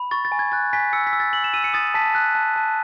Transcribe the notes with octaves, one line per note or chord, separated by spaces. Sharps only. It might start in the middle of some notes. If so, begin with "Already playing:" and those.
Already playing: B5
C#6 A6
A6
G#5
G#6
F#6 A6
G#5 B6
E6 C#7
B6
E6
A6
E6 F#7
E7
E6 D#7
C#7
D#6 A6
A5 B6
F#6
A5
A5